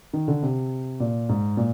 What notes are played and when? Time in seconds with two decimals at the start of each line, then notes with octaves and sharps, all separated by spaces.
0.13 D#3
0.28 D3
0.43 C3
1.00 A#2
1.29 G#2
1.57 A#2